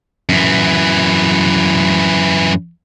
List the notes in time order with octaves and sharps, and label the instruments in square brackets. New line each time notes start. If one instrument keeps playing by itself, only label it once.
[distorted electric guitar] F#2 E3